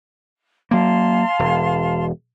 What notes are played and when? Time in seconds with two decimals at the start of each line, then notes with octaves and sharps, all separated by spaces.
0.71 F#3 A#3 F5 A5 C6
1.39 E1